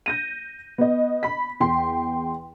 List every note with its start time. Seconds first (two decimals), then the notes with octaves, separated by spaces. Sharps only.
0.06 G6 A#6 D#7
0.78 B3 D#5
1.23 B5 B6
1.60 E2 G5 C6